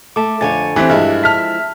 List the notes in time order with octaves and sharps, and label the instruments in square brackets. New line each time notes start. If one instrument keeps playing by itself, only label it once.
[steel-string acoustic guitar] A3 [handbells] E5 A5 D6
[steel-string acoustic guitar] F2 D3 C#5 [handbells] G#5 A6
[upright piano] E3 C4 [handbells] G4 E5 F#6
[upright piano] G2 [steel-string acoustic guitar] F3 G#3 E4
[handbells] E5 B6 [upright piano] A5 F6